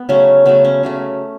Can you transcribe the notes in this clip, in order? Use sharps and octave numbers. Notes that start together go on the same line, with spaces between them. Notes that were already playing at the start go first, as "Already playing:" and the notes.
Already playing: B3
C#3 F#3 A3 C#4
C#3 F#3 A3 B3
C#4
C#3 F#3 A3